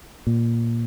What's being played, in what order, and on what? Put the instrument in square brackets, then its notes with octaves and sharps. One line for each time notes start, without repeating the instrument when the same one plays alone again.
[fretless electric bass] A#2